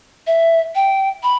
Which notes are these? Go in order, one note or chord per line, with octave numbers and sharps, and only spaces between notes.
E5
G5
B5